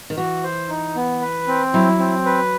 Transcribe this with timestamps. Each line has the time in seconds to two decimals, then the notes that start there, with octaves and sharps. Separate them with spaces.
0.10 D#3
0.17 E3 F#4
0.43 C5
0.69 D#4
0.96 B3
1.21 B4
1.48 C4
1.74 F#3 E4
1.99 C4
2.25 B4